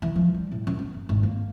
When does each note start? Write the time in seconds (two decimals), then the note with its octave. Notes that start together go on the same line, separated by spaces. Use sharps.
0.02 E3
0.16 F3
0.34 G3
0.51 A2
0.67 F#2
0.79 B3
0.94 F#1
1.09 G#1
1.23 A#3